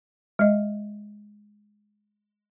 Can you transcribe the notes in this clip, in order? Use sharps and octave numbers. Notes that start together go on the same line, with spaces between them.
G#3 D#5